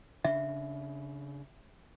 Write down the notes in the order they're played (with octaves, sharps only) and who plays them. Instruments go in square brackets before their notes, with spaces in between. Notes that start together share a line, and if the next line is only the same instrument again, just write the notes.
[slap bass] C#3 D4 [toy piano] E5